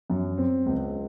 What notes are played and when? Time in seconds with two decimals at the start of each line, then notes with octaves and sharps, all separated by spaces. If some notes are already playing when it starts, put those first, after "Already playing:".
0.10 F#2
0.38 C4
0.66 C#2